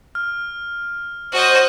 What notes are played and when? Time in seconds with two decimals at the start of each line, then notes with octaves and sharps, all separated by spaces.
0.15 F6
1.32 F#4 C5 D#5